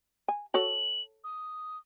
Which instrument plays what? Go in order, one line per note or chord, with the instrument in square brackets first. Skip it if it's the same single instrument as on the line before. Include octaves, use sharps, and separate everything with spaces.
[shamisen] G#5
[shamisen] F#4 A4 C#5 [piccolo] F#7
[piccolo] D#6